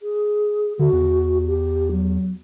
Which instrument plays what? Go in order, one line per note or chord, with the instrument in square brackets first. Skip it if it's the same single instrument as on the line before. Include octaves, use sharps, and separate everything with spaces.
[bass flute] G#4
[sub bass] D3 [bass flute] F#4
[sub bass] E2
[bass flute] G4
F#3